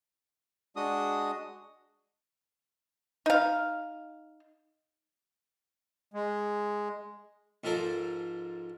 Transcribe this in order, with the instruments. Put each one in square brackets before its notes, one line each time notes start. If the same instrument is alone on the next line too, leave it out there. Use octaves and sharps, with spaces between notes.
[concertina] G#3 D4 F#4 D#5 D#6
[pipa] D#4 F5
[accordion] G#3
[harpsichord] G#2 F3 A4 A#4 C5